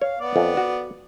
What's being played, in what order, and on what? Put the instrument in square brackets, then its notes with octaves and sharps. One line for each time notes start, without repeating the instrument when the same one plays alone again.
[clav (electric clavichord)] C#5 [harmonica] F5
[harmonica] B3 D5
[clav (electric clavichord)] F2
F#4